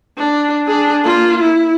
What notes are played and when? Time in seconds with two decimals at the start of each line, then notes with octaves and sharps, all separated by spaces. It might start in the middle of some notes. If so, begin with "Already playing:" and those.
0.17 D4
0.66 D4 G#4
1.03 A#3 F4
1.41 E4